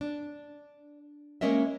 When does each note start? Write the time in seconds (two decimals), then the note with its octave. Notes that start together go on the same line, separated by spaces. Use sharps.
0.01 D4
1.41 G#3 A#3 C#4 A#4 D#5 E5